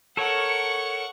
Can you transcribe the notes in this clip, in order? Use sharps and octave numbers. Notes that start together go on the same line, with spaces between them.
A4 A#4 C#5 F#5 C#6